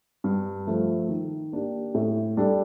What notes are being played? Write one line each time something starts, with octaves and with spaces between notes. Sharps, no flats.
G2
F3 A3
D#3
A#3 D4 G4
A2
G3 D4 A4